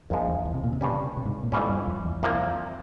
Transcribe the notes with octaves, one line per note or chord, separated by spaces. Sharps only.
A#1 F2 A#2 F3 G#3
E2
E2
C3
A#2
C3
G2 C#3 G3 C#4
C3
G#2
A#2
F2 G#2 E3 G3 C#4
G2
F2
E2
C2 F2 C3 F3 A#3